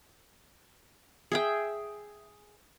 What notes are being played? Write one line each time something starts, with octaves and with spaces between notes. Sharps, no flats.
G#4 E5 G5